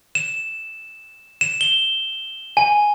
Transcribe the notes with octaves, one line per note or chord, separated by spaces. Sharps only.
E7
E7
G7
G#5